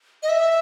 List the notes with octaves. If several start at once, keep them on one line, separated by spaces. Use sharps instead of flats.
D#5
E5